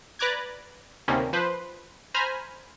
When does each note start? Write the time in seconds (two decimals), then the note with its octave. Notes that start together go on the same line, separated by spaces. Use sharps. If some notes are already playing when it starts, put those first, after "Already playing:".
0.19 B4 D5 A#5 D6 F#6 G#6
1.08 D2 C3 D#3 G3 A#3 C#4
1.33 F3 B4 C5
2.14 C5 G#5 A#5 B5 F6